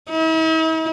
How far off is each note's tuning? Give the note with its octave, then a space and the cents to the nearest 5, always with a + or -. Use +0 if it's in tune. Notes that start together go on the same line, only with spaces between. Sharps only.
E4 -45